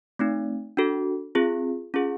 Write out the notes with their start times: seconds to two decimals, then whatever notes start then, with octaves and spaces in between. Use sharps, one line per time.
0.19 A3 C4 D#4
0.77 D4 F#4 A4
1.35 C4 F4 G#4
1.94 C#4 F4 G#4